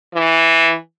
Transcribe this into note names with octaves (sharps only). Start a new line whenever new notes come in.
E3